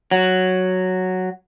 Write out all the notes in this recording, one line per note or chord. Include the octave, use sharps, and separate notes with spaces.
F#3